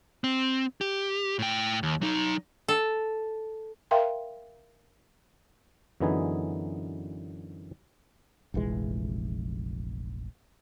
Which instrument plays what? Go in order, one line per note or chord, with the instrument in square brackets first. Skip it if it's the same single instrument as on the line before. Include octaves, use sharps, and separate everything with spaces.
[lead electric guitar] C4
G4
A2 G5
D#2
F#3 D#4
[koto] A4
[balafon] A#4 E5 F5 G5 A#5 C6
[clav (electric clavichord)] F#2 D3 E3 B3 D#4 G#4
[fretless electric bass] F1 A#1 E3 G#3